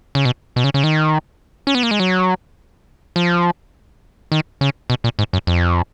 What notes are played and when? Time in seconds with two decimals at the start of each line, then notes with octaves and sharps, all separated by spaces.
0.15 C#3
0.25 B2
0.56 B2
0.64 C#3
0.74 C#3
0.84 D#3
1.67 C#4
1.75 B3
1.83 A#3
1.91 G#3
2.00 F#3
3.16 F3
4.32 D#3
4.61 C#3
4.90 B2
5.04 A#2
5.19 G#2
5.33 F#2
5.47 F2